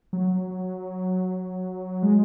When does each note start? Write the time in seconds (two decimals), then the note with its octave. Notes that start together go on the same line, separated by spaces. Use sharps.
0.13 F#3
2.03 G#3